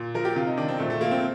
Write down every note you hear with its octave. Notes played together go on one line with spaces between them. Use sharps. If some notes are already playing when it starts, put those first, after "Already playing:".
Already playing: A#2
F3 A#4
G4
C3 F4
D#4
D#3 D4
C4
A#2 A3
A3
F3 A#3
C4